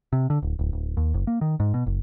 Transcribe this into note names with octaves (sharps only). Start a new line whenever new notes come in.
C3
D3
D1
D1
D1
D#2
F#1
A#3
D#3
G#2
B2
F#1